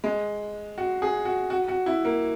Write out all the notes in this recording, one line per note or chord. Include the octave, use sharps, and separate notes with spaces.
G#3
F#4
G#4
F#4
F#4
F#4
E4
A#3